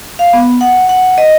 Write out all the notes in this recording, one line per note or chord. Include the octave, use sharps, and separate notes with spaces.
F5
B3
F#5
F#5
D#5